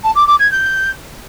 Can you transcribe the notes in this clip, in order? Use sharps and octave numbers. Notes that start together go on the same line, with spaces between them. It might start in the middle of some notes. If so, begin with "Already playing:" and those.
A5
D6
D6
G#6
G6